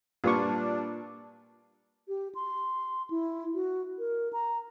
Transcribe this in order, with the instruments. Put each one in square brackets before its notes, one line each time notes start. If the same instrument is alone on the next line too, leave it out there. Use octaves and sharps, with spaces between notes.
[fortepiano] A#2 [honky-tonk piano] G3 [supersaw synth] D4 [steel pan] F4 B4 C#6
[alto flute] G4
C6
E4
F#4
A#4
A#5